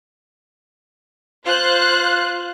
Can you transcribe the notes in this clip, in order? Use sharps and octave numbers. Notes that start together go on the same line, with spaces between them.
F4 C5 F5 F#6